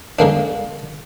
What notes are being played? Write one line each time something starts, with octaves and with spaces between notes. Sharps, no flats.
D3 G#3 A#3 D4